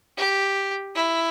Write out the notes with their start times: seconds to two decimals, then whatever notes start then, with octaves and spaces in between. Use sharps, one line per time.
0.18 G4
0.95 E4